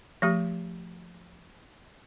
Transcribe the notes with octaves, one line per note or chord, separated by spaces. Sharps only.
F3 A3 G4